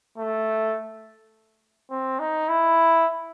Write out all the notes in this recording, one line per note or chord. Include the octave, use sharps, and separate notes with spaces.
A3
C4
D#4
E4